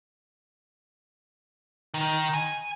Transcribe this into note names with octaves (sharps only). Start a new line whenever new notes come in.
D#3
G#5